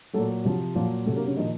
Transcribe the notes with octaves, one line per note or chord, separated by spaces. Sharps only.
A#2 F#3 A3 A4
C3 F3 F#3 F#4
A#2 F3 F#3 F4
C3 F#3 A3
A#3
C#3 C#4
A#2 D#3 F3 D#4